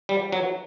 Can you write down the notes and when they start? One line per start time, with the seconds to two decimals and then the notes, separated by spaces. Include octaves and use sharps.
0.09 G3
0.32 F#3